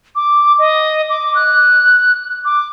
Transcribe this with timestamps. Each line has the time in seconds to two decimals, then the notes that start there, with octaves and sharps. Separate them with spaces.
0.15 D6
0.59 D#5
1.10 D6
1.35 F#6
2.45 D6